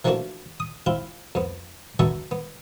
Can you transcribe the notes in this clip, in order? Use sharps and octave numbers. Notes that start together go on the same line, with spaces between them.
E3 F3 A3 A#3 D4 F#4
D#6
C4 E4 F4
F2 B3
D3 F#3 B3 E5 A5 C#6
B3